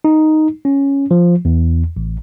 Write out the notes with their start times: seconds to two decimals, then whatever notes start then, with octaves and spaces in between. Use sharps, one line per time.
0.04 D#4
0.65 C#4
1.11 F3
1.45 E2
1.97 A1